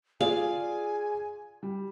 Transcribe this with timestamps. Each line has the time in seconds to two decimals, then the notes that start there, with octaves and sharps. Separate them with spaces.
0.21 F4 G#4 D5 F5 G#5
1.63 G3